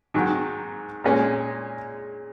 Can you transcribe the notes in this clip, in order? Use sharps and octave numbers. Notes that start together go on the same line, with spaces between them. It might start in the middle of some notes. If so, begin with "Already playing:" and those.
G#2 D#3 F#3
A#2 G#3 C#4